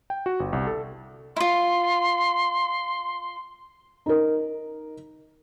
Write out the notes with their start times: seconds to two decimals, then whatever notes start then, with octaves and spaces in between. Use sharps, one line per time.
0.10 G5
0.26 F#4
0.40 G1
0.53 C2
0.67 A4
1.36 E4 F4 C6
4.06 D#4 A#4